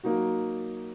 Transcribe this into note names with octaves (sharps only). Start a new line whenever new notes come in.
F#3 A#3 D#4 F#4